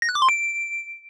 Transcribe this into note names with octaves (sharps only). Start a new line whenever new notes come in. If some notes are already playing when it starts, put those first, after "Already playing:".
A#6
F#6
D6
C6
D7